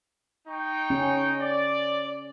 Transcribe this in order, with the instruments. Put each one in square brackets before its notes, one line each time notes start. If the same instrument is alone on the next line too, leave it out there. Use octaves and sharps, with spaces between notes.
[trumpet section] D#4 G5 C#6
[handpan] C#4
[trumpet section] D5